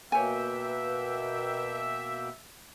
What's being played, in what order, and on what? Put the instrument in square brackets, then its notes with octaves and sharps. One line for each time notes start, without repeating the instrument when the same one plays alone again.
[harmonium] B2 A#3 G5 [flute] B4 [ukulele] C#5 G#5 [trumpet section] E5